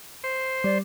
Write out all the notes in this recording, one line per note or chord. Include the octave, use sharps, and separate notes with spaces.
C5
G3 D5